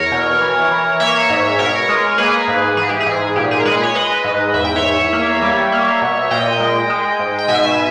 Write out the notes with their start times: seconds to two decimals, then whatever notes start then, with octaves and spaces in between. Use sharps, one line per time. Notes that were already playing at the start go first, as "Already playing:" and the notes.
Already playing: E2 A#4 C#5
0.12 B2
0.42 E3
0.71 E3
1.00 A#3 C#5 E5
1.30 G#2
1.59 B2 A#4 C#5
1.89 G#3
2.18 A#3 G#4 B4
2.48 G#2
2.77 E3 G#4
2.89 G4
3.00 G#4
3.06 G#2
3.36 A#2 G4
3.51 G#4
3.60 A#4
3.65 G#3 G#4 B4
3.83 C#5
3.95 G#3 B4 D#5
4.24 G#2
4.54 E2 E5
4.65 G5
4.76 C#5 E5
4.83 E2
5.13 A#3
5.42 G3
5.72 A#3
6.02 B2
6.31 A#2 D#5 G5
6.60 G#3
6.90 G#3
7.19 G#2
7.39 G5
7.48 B2 E5 G#5